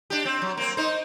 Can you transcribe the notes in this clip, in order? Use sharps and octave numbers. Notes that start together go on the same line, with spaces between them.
D4 G4
C4
F#3
A#3 C4
D#4 C5